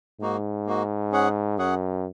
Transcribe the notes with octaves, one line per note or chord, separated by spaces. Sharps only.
G#2 A#3 D#4 F#4
A#3 D#4 F#4
C#4 G#4 F#5
F#2 C#4 G#4 F#5